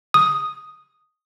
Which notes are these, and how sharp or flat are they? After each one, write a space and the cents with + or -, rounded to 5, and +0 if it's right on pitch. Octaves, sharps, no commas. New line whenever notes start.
D#6 +0